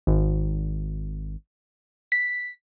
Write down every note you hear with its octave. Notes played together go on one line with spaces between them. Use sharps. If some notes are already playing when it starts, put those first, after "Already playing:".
G#1
B6